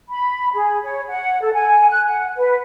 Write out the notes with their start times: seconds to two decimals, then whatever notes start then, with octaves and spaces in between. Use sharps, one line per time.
0.09 B5
0.53 G#4
0.83 C#5
1.09 F#5
1.41 A4
1.54 G#5
1.90 F#6
2.07 F#5
2.36 B4